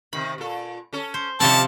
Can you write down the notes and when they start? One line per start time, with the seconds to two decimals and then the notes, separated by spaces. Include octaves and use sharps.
0.13 C3 D#3 B5
0.38 A#2 A4
0.93 C#4 A4
1.14 C5
1.40 C3 D#3 F3 G3 C4 C#4 A5